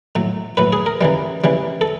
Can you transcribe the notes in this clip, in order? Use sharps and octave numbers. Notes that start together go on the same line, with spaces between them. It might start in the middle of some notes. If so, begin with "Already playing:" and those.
A2 F#3
A2 F#3 B4
G#4
A#4
C#3 E3 G3
C#3 E3 G3
A4